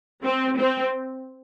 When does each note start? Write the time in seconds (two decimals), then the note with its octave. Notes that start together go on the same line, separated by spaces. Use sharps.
0.24 C4
0.58 C4